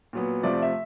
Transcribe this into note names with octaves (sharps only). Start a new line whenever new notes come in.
A#2 F#3 B3
C3 F3 A3 D5
D5
E5